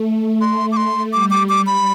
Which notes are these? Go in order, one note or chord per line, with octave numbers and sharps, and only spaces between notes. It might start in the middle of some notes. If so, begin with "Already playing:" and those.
Already playing: A3
C6
D6
C6
G3 D6
D6
D6
B5